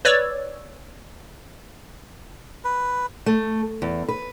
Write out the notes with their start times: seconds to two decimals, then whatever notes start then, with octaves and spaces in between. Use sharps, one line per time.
0.05 B4 C#5 D5 E6
2.64 B4
3.26 A3
3.82 E2
4.08 B4